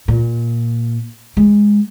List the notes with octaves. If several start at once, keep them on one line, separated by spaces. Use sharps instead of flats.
A#2
G#3